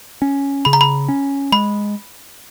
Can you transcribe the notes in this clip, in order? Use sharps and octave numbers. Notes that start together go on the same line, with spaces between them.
C#4
C#3 B5
A#5
B5
C#4
G#3 B5